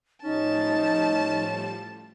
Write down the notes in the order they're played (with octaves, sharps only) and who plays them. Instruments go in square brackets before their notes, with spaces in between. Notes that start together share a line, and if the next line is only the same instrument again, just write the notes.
[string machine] A2 F3 G3 [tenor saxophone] C#4 [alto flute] D#4 [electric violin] A5